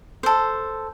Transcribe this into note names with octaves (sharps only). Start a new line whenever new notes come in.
A4 C5